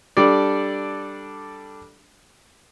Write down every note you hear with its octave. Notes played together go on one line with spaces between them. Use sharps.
G3 D4 A4 D5